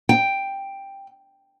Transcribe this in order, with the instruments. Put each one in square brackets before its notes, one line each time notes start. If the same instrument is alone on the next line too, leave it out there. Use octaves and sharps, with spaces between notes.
[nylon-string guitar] G5